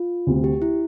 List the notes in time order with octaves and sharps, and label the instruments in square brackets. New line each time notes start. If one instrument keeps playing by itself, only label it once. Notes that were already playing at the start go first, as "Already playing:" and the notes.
Already playing: [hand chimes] F4
[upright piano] D2 C3 G3 C4
[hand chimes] G4
E4